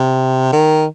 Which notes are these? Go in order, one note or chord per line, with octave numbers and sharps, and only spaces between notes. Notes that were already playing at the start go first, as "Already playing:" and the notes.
Already playing: C3
D#3